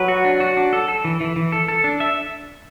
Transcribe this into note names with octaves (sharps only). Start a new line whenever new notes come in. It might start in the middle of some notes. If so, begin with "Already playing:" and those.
Already playing: F#3 B4
F#4
D4
F#4
D4
A4
A4
E3
E3
E3
A4
A4
D4
E5